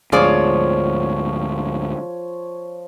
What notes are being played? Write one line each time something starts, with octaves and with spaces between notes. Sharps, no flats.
D2 G#2 F3 F4 G#4 C#5 D5